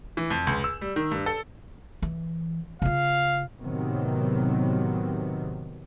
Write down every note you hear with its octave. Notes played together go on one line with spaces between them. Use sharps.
E3
F2
C#2
E6
G3
D#3
G2
A4
E3
C#3 F4 F5
A2 C3 D#3 F#3 B3